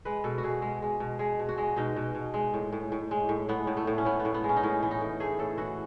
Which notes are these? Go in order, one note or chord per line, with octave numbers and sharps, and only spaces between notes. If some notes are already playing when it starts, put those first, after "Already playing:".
G#3 B4
B2 A4
F#4
B2 G#4
G#3
G#3
B2
G#3 G#4
B2
F#4
G#3
B2 D#4
B2
B2
G#3
A2
A2
A2
G#3
A2
A2 B3
A2
A3
A2
C#4
A2 B3
B3
A2
B3
G#3
C#4
D#4
A2 C#4
E3
D#4
A2
A3 G#4
A2 A4
E3 F#4